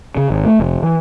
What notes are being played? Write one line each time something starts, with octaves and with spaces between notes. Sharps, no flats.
C#3
G#1
A3
F1
E3